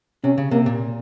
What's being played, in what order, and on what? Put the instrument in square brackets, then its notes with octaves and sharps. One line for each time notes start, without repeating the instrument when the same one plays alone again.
[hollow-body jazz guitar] C3 [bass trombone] C#4
[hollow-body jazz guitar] C#3
[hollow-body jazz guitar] C3 [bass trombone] A#3
[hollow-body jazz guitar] A#2